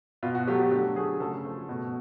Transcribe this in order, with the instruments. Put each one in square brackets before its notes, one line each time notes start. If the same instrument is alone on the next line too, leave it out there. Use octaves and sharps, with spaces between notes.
[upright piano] B2 F4
F#4
F#3 A3 G4
G4
D3 G4
F#3 A3 G#4
C#3 A4
F3 A3
B2